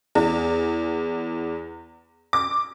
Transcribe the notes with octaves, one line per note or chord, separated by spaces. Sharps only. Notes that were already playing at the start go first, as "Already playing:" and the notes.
E2
D6